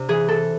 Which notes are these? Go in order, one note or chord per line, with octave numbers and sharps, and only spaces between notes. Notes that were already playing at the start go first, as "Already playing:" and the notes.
Already playing: C3 C4 D4
E3 G#4
A4